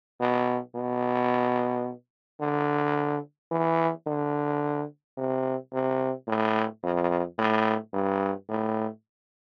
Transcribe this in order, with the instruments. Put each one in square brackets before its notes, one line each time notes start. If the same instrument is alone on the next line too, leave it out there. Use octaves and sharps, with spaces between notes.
[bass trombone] B2
B2
D3
E3
D3
C3
C3
A2
F2
A2
G2
A2